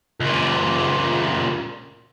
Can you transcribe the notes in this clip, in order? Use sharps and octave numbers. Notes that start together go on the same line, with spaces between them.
C#2 A#2